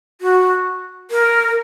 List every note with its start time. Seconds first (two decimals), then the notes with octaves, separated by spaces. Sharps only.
0.21 F#4
1.11 A#4